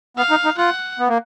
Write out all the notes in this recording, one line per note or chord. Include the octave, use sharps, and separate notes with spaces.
B3 F5
D#4
D#4
F4 F#5
B3
A#3